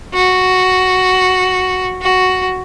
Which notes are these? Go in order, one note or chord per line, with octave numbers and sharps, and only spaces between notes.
F#4
F#4